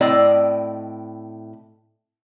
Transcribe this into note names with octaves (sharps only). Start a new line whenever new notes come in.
A2 C4 E4 D5 D#5 G5